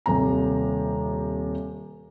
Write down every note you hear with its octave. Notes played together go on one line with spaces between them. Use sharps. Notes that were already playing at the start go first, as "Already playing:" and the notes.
D#1 C3 A#5